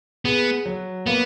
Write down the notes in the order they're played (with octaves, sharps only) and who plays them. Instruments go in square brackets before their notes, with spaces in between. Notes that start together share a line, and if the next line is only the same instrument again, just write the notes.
[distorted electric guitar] B3 [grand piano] G#4
[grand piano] F#3
[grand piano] A#3 [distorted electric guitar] B3